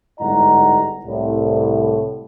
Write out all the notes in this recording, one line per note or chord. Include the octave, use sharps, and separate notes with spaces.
G1 G#2 E4 D#5 F#5 A#5
C2 A2